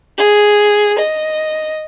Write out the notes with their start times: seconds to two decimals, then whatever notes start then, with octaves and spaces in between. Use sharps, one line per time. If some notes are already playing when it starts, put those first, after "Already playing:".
0.18 G#4
0.99 D#5